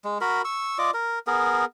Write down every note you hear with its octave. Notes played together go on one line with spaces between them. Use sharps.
G#3
F#4 A#4 B5
C#6 E6
F4 D5 D#5 D6
A#4
B3 G#4 A#4